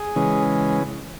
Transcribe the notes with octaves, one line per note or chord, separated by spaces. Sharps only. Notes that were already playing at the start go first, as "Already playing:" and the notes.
Already playing: G#4
C#3 E3 G#3 C#4